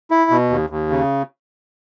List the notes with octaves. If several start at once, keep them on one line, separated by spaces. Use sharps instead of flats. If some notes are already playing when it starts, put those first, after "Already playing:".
E4
B2
D#2
D#2
C#3